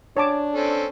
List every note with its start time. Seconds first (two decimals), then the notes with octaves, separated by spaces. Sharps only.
0.17 D4 C#5 A5 D6
0.55 C4 C#4 A4